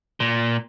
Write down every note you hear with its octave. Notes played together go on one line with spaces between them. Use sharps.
A#2